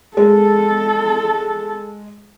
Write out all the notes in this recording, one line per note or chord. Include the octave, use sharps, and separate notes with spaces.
G#3 A4